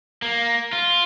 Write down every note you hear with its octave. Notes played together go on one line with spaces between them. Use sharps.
A#3
F4